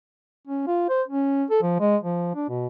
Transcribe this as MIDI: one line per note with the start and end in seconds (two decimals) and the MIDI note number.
0.47 0.66 61
0.67 0.85 65
0.89 1.02 72
1.08 1.44 61
1.50 1.60 69
1.62 1.76 53
1.80 1.96 56
2.03 2.34 53
2.35 2.49 62
2.49 2.67 47